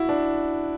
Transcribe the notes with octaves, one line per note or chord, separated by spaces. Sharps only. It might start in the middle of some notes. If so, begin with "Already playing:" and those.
Already playing: E4 F#4
D4